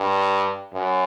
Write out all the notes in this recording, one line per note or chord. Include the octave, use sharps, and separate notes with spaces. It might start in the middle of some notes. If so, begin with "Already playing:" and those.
Already playing: G2
F#2